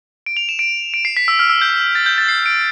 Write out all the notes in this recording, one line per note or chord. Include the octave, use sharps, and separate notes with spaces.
D7
F7
E7
D7
D7
C7
B6
E6
F6
E6
G6
A6
G6
A6
C7
D7